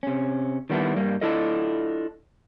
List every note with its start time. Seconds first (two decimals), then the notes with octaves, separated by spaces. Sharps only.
0.03 C3 C#4
0.70 D#3 G3 B3 D4 E4
0.96 G2 G3 A#3
1.21 D4 E4 F4 A4 D#5